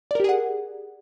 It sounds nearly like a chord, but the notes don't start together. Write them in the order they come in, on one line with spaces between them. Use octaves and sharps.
D5 A#4 G4 G#4 F#5